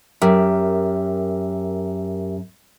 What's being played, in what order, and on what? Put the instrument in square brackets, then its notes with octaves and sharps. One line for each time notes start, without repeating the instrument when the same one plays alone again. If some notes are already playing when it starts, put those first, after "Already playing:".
[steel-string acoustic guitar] F#2 [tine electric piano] G4 A#4 E5